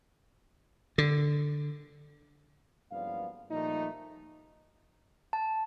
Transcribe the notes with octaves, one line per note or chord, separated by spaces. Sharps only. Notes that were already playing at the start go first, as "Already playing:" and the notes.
D3
F#1 G2 F3 B3 D5 F5
A#2 F3 G3 A3 D#4
A5